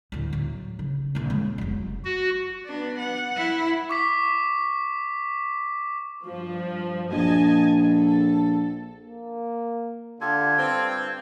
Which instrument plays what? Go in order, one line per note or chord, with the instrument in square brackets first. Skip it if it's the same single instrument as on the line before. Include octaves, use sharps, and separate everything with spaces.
[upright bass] D2 A2
F#3
C#3
A#1 D3
G#3 C#4
F1 F#3
[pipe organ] F#4
[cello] B3 D4
F#5
E4
[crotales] C#6 D6 B6
[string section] G2 F3
[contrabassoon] A#1 [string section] D#5 G#5 A5
[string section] A4
[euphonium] A#3
[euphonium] D3 [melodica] F4 G4 A4 [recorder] G#6
[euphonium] G2 [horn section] C4